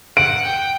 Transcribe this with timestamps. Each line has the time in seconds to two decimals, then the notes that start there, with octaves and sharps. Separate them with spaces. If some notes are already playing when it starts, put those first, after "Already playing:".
0.17 F#5 D7
0.46 G5